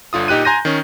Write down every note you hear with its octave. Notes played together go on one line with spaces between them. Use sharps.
G1 D3 F4 D#6
A#2 D#4 G4 F#6 D#7
G#5 A#5 C6 G6 A#6 D#7
D#3 C#4